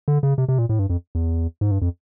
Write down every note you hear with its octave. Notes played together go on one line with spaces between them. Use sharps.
D3
C#3
C3
C3
A#2
A2
G2
F2
E2
G#2
G2
F2